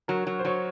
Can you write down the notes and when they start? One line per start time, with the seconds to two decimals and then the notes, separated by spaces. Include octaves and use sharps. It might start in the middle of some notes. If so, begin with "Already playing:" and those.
0.08 F#3 A#4
0.27 F#3
0.39 C5
0.45 F#3 C#5